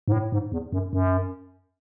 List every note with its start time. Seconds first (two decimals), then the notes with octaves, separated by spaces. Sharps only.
0.08 G#2
0.12 A2
0.32 G#2
0.52 E2
0.72 F#2
0.93 F#2